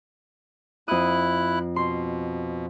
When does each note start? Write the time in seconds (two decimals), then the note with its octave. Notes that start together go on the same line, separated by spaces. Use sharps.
0.88 F2 E4 D#6 F#6
1.76 B2 C6